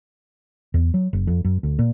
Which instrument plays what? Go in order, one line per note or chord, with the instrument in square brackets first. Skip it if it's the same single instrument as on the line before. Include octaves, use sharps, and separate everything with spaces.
[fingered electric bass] E2
F#3
F#1
F2
F#2
D2
A#2